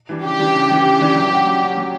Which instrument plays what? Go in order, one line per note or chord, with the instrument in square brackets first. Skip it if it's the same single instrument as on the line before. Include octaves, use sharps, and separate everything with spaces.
[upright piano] E3 G3 D4
[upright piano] C#3 [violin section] G4
[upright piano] E3 G3 D4
C#3
E3 G3 D4
[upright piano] C#3 [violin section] G4
[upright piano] E3 G3 D4
F#3
C#4 F#4
F#3
C#4 F#4
F#3